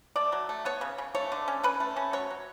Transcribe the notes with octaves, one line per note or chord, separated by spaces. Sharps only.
A3 D5
F#3
A3
B3 C#5
C#3
C#3
A3 C#5
D3
C#4
C#4 B4
A3
C#4
F#3 C#5
F#3